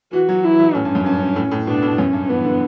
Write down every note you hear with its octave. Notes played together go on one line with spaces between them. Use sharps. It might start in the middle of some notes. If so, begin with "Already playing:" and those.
E3 F#4
F#3
E3 E4
F#3
A2 C#4
G2
F#2
G2
A2
A2
B2 D4
A2
F#2 C#4
G2
E3 B3
D3